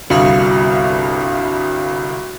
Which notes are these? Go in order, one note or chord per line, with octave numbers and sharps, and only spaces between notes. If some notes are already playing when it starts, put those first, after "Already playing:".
G1 C2 G2 F#4 F5 D#6